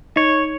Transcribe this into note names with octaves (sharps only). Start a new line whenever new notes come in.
D#4 C#5